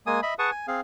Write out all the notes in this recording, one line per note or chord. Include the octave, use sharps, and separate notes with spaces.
G#3 A#3 G#5 D#6
D#5 E5 B5
G#4 B4 F#5 A5 C#6 D#6
G#5
C4 G#4 F5